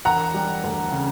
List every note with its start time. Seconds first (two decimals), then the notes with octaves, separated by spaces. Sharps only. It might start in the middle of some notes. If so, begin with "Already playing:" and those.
0.05 E1 F#5 A#5
0.34 G3
0.64 D2
0.92 C#3